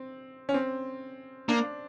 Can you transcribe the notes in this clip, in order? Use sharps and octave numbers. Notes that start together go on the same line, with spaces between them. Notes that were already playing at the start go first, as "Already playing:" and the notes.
Already playing: C4
C#4
C4
A#3 D4